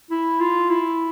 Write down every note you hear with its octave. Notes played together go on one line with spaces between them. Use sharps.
E4
F4
E4